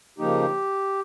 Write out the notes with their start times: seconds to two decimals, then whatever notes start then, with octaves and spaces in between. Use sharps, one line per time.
0.18 C#3 F3 A#3 D#4 G4